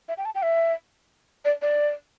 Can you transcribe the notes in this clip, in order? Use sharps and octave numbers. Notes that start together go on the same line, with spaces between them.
E5
G5
A5
G5
E5
D5
D5